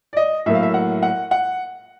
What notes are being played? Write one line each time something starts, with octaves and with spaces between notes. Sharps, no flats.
D5
D#5
A2 F#3 A#3 E5
F5
E5
F#5
F#5
F#5